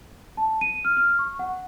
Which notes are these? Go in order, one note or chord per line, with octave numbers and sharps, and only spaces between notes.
A5
D#7
F6
F6
C#6
F#5